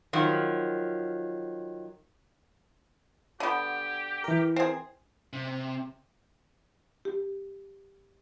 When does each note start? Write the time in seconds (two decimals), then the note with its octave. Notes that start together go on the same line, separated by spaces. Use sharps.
0.13 D#3 F3 F#3
3.40 D3 B3 G4
4.24 E3 A#4
4.56 C4 G#4
5.33 C3
7.05 G4